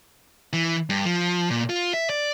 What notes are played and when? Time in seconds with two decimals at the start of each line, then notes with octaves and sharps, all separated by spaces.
0.53 E3
0.90 G2
1.05 F3
1.50 A#2
1.69 F4
1.94 E5
2.10 D5